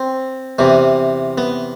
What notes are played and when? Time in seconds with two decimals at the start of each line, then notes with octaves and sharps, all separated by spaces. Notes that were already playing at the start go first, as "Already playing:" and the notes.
Already playing: C4
0.59 E2 C3 E3
1.38 B3